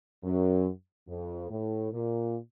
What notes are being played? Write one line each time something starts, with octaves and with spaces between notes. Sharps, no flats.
F#2
F2
A2
A#2